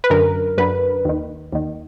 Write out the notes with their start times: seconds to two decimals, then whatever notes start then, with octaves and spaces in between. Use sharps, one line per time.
0.04 B4
0.10 F#2 D3 A#4
0.58 F#2 D3 B4
1.05 D#2 D#3
1.53 D#2 D#3